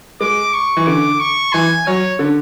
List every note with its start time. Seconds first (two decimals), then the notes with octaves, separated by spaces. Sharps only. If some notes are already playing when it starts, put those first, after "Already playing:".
0.21 G#3 D6
0.54 C#6
0.77 E3
0.87 D3 D6
1.20 C#6
1.53 E3 G#5
1.87 F#3 C#5
2.19 D3